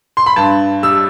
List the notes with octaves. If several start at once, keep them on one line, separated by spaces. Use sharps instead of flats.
C6
B5
G2 A5
G3 E6